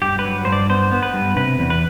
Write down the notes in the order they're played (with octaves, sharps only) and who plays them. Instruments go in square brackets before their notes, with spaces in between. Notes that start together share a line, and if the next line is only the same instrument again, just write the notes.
[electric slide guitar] G2 G4
B4
F#3
G2 C5
D5
B3 C5
B3
B4
G2
C3 B4
E2
B4